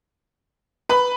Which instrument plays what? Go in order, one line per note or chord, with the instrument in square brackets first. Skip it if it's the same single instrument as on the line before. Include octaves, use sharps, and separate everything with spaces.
[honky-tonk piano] B4 B5